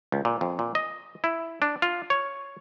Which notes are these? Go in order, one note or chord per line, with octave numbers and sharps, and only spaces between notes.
C#2
A#2
F2
A#2
D#5
E4
D4
F4
C#5